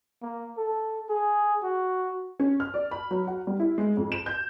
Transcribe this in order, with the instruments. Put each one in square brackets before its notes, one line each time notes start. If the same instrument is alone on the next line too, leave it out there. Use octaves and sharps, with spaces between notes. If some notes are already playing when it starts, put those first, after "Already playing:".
[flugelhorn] A#3
A4
G#4
F#4
[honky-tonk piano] C#4
F6
D5
B5
F#3
F#5
G3
E4
G#3
F2
E7
G6